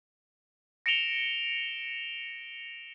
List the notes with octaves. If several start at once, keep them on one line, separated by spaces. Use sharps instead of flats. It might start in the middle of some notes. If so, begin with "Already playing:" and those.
A#6 C#7 D7 E7 F7 G7